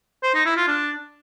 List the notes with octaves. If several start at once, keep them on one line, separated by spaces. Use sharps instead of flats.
C5
D#4
E4
F4
D4